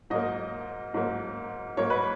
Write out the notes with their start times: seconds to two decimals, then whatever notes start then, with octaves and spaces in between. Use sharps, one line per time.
0.10 G#2 F#3 A#3 D#5
0.94 G#2 F#3 A#3
1.77 G#2 F#3 A#3 C#5
1.90 B4